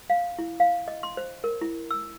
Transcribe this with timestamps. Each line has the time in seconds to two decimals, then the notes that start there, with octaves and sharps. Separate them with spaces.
0.10 F5
0.39 E4
0.60 F5
0.88 D#5
1.03 C6
1.17 C5
1.44 A#4
1.61 E4
1.91 E6